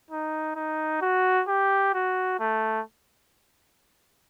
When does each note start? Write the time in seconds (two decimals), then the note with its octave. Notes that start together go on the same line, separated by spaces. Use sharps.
0.11 D#4
0.56 D#4
1.02 F#4
1.48 G4
1.94 F#4
2.40 A3